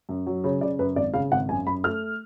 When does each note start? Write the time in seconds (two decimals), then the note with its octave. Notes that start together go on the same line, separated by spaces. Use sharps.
0.09 F#2
0.27 F#3
0.44 C#3 C#5
0.61 C#3 D5
0.79 F#2 B4
0.96 G#1 D5
1.13 C#3 F5
1.32 G#1 F#5
1.49 F#2 G#5
1.66 F#2 B5
1.84 A3 F6